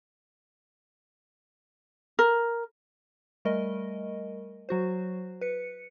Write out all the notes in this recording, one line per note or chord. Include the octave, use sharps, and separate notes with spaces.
A#4
G3 A3 A#4 D#5
F#3 F#4 C5
B4 C#7